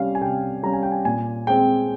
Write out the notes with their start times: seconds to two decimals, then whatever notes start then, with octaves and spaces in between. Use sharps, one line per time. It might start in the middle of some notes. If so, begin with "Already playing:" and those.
Already playing: C3 G3 C#4 F5
0.15 G#5
0.21 C3 G5
0.63 G3 C#4 A#5
0.73 G#5
0.83 G5
0.92 G#5
1.05 A#2 G#5
1.47 G#3 C4 G5